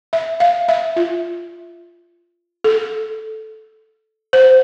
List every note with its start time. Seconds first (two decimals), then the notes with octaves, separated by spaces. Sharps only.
0.13 E5
0.40 F5
0.68 E5
0.96 F4
2.64 A4
4.33 C5